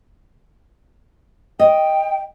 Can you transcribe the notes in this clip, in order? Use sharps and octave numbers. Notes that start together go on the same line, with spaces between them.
D#5 G5